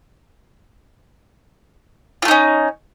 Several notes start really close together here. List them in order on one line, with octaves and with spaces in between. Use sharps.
F4 A3 D#4 C#4